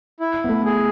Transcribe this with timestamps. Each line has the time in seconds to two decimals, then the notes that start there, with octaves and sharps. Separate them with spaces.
0.20 E4
0.44 B3
0.49 A3
0.65 G#4